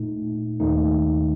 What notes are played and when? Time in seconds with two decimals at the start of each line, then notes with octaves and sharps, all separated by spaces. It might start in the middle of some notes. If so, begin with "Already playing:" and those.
Already playing: A#2 A3 D#4
0.60 D#2 D#3 A3 D#4